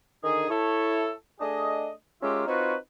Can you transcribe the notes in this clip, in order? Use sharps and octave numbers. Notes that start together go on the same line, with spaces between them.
D3 D#3 D#4 G#4
E4 A4 C#5
A3 D4 G#4 D#5
G#3 C#4 F4 G4 A#4 E5
C4 D#4 F4 F#4 B4 C#5